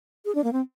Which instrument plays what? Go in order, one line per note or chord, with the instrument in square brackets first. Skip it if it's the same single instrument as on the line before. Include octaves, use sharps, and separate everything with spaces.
[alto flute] G#4
D4
A#3
C4